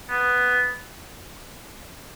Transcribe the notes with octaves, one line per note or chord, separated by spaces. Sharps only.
B3